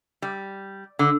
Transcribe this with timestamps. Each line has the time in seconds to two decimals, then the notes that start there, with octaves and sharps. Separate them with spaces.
0.22 G3
0.99 D3